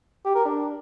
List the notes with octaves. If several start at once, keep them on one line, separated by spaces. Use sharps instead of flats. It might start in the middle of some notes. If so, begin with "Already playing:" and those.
G4
A#4
D4